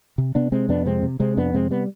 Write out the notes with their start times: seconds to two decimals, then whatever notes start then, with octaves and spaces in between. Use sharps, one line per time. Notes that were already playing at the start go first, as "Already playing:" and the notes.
0.18 C3
0.35 C3 B3 D4
0.52 C3 G#3 C4
0.69 F2 B3 D4
0.86 C3 G#3 C4
1.03 C3
1.20 C3 G#3 C4
1.37 F2 B3 D4
1.54 C3 G#3 C4
1.71 G3 B3